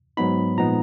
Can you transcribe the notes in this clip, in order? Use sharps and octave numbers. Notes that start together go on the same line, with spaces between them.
G#2 F#3 B3 D#4 B5
A#2 F3 G#3 B3 D#4 A#5